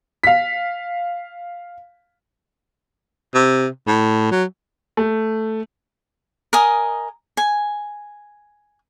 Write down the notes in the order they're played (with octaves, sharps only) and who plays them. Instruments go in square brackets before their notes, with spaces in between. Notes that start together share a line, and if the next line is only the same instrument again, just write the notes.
[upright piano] F5 B6
[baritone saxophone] C3
A2
F#3
[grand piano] A3
[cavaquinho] A#4 D#5 G#5 D#6
G#5